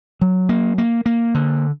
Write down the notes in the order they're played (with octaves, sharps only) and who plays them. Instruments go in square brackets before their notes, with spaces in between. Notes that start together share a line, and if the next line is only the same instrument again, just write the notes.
[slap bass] F#3
A#3
A#3
A#3
D3